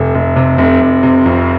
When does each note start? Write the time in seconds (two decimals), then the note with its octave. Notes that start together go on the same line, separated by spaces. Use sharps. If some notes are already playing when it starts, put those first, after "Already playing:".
Already playing: F1
0.15 F1
0.36 C3
0.58 F1
0.80 F1
1.03 C3
1.26 F2